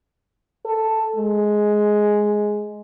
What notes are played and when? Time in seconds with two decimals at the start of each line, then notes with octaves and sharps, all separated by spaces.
0.65 A4
1.16 G#3